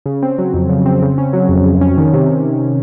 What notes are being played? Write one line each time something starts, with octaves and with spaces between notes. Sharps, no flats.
C#3
C4
F#3
F2
C#3
C4
C#3
C#4
F#3
F2
C#3
C#4
D#3
C3